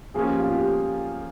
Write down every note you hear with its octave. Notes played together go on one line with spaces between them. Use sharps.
F3 A#3 C#4 G#4
G4
F4
G4